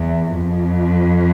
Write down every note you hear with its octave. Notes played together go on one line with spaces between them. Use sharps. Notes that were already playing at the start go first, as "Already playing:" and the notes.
Already playing: E2
F2